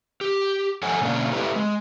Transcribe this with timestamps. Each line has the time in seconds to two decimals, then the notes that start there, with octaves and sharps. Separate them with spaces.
0.21 G4
0.83 F3 A4 C#5 F#5 G#5
1.01 B2 D3 A#3 C#4 D4
1.32 A3 C4 E4 G4 A4 B4
1.56 G#3